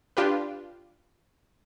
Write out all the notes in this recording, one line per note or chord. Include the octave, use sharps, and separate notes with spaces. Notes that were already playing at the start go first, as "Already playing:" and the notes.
D4 F4 G4 B4